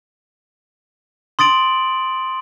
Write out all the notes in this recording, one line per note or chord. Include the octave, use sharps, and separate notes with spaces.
C6 D#6 A6 D7 F#7